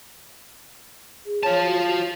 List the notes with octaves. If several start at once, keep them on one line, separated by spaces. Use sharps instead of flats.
G#4
F4 C#5 A5
F#4
F#4